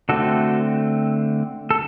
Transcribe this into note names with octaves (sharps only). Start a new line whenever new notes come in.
D3 A3 C4 F#4 A4
A4